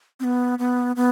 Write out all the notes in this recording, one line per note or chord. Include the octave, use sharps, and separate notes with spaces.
C4
B3
B3
B3